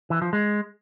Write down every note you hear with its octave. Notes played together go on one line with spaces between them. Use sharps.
E3
F3
G#3